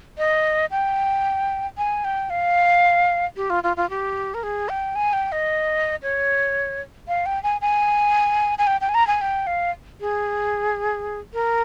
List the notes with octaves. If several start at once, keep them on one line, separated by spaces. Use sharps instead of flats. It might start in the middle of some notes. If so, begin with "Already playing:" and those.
D#5
G5
G#5
G5
F5
G4
F4
F4
F4
G4
A#4
G#4
G5
G#5
G5
D#5
C#5
F5
G5
G#5
G#5
G#5
G5
G5
G#5
A#5
G#5
G5
F5
G#4
A#4